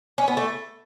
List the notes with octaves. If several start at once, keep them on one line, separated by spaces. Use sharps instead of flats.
C#4
B3
A3